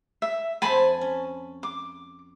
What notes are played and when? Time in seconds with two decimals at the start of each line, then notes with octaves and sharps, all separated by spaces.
0.22 E5
0.62 F2 C5 G#5 A5 B5
1.01 C#4
1.63 D6